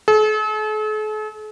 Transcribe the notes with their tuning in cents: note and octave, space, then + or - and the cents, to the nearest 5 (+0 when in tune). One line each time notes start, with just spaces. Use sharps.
A4 -45